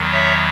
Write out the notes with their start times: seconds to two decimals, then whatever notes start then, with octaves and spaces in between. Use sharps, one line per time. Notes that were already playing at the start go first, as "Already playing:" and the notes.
Already playing: E2 D#3 F#3
0.12 C#5 E5